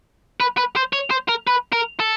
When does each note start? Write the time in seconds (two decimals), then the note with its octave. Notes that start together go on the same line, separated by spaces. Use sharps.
0.40 B4
0.57 B4
0.76 C5
0.93 C#5
1.10 C5
1.28 A#4
1.47 B4
1.73 A#4
2.00 A4